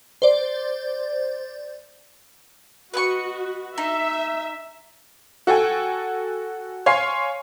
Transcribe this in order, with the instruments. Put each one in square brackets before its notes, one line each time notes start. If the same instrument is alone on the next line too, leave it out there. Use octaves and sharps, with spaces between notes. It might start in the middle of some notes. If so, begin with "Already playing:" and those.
[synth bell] C5 D5
[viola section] F#4 [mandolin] B4 D#5 C#6
[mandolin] D#4 [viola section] E5
[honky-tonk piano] F#4 A4 G5 G#5
C#5 F5 G#5 C6 C7